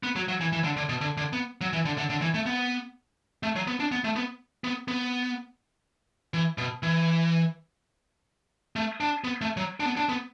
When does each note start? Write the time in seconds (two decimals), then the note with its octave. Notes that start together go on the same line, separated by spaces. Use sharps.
0.03 B3
0.16 F#3
0.28 F#3
0.41 E3
0.53 E3
0.64 D3
0.77 D3
0.89 B2
1.01 D3
1.17 D3
1.33 B3
1.61 F#3
1.73 E3
1.85 D3
1.98 D3
2.10 D3
2.22 E3
2.34 A3
2.46 B3
3.43 A3
3.56 F#3
3.67 B3
3.80 D4
3.92 B3
4.04 A3
4.16 B3
4.64 B3
4.88 B3
6.34 E3
6.58 B2
6.83 E3
8.76 A3
9.00 D4
9.24 B3
9.41 A3
9.57 F#3
9.80 D4
9.86 B3
9.97 D4
10.09 B3